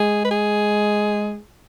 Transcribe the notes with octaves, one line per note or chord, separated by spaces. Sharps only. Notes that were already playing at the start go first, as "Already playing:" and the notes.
Already playing: G#3 G#4
B4
G#4